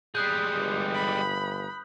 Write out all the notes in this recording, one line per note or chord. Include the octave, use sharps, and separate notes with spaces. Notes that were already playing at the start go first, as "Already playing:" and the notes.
G3 G#3 D#6 F#6 G6
G1
B5